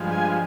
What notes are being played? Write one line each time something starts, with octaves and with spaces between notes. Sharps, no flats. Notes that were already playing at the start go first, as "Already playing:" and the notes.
Already playing: G2 F3 G#3
G#5